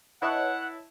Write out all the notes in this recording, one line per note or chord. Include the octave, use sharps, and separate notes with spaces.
E4 B4 C#5 D#5 E5 F#5 A5